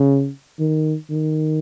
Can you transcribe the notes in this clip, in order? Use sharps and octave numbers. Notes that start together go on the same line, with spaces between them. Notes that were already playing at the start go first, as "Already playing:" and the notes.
Already playing: C#3
D#3
D#3